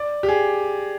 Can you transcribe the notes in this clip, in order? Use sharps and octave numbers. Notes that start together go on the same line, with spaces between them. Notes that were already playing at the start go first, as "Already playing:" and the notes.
Already playing: D5
G4
G#4